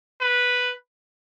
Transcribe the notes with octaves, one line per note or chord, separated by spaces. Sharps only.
B4